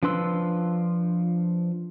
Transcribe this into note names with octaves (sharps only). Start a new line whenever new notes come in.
F3 D4 B4 C6 E6